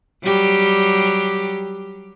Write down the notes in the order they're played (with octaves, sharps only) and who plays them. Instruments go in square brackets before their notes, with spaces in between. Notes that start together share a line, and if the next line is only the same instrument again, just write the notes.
[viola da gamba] F#3 G3 G4